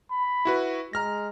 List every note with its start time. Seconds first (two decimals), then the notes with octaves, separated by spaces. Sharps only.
0.12 B5
0.45 E4 F#4 B4
0.93 G#3 A#5 F6 A#6